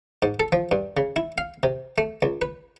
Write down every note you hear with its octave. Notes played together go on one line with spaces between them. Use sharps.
G#2
A4
F3
G2
C#3
E4
F5
C3
A3
C#2
B4